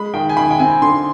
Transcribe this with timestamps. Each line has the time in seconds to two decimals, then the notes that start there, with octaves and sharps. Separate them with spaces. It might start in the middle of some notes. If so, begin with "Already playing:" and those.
Already playing: G#3 B5
0.14 D#3 G5
0.29 G#5
0.37 D#3 B5
0.51 G5
0.59 C4 G#5
0.82 D3 C6